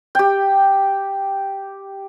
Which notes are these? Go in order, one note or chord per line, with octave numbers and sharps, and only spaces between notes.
G4 G5